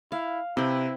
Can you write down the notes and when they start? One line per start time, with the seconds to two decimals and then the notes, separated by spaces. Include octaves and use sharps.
0.12 E4 F5
0.57 C3 C4 E4 B4